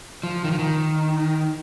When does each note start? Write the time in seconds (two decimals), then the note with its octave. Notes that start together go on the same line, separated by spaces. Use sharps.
0.23 F3
0.44 D#3
0.51 F3
0.59 D#3